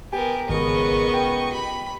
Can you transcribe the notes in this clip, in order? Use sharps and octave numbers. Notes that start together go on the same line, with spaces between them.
B3 G4 A#4 G#5
G#1 C#2 B3 G#4 A#4 D#5 C#6
G5
G4 B5